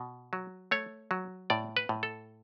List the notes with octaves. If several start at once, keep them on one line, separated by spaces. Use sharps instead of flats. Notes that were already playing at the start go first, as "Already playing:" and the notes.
Already playing: B2
F#3
A3 C#5
F#3
A2 D5
B4
A2
A4